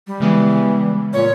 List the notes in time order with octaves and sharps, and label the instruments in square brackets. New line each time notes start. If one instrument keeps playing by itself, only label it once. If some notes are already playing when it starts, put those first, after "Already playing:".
[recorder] G3
[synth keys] C#3 G#3 B3 [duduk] E3
[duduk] A#2 [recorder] C#5